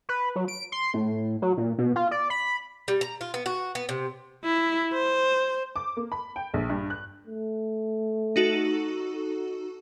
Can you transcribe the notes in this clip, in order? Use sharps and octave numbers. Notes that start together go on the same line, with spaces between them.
B4
F#3
D7
C6
A2
F#3
A#2
B2
F4
D5
B5
G3
A#5
F4
B3
F#4
B3
C3
E4
C5
D6
A#3
B5
G5
A#1
G2
F#6
A3
D#4 F#4 A4